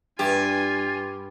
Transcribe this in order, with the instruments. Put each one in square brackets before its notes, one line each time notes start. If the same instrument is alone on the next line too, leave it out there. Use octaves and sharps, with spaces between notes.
[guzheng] G2 [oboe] F4 [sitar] G4 [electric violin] G#5